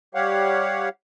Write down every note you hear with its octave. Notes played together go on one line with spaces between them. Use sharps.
G3 G4 C#5 F5 F#5